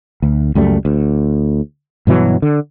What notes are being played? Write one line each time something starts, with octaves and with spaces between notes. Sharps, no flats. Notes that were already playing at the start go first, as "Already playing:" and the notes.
D2
C#2 F#2 G3 A3
D2
G2 B2 E3 F#3
D3